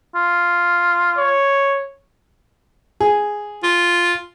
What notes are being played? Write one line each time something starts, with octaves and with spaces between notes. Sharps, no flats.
F4
C#5
G#4
F4